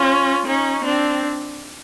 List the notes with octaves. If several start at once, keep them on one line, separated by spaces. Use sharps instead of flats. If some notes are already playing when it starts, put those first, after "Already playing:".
Already playing: C#4 F4
C#4 D#4
C4 D4